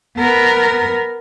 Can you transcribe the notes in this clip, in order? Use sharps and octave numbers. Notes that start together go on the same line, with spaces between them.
B3 A#4